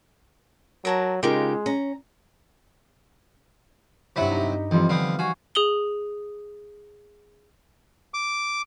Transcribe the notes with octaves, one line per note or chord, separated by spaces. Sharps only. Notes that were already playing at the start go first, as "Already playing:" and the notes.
F#3 A#4 A5 A#5
C#3 G#3 D#4 F4 G4 A#4
C#4 A#5
G2 C3 F#3 E4 F#5 B6
D#4 G4
F2 E3 F3 G3
D3 B3 C4 F5
F#4 F5 G#5 C#6
G#4 D#6 F#7 G7
D6